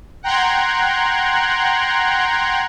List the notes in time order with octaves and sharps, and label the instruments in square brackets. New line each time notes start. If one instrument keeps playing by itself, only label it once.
[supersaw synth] F#5 G5 A#5 C6 F#6 G#6